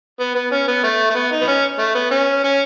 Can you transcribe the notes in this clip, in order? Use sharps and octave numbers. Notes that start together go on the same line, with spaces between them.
B3
B3
C#4
B3
A3
A3
B3
D#4
B3
C#4
A3
B3
C#4
C#4